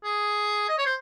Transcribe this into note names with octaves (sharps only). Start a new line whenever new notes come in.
G#4
D#5
C#5
C5